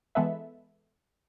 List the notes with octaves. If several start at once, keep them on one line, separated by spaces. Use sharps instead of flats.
E3 G#3 B3 A4 B4 E5